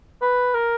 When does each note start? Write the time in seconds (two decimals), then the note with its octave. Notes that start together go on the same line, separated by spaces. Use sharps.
0.22 B4
0.54 A#4